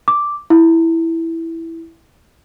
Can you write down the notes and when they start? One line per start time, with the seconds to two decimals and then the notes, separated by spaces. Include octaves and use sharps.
0.08 D6
0.50 E4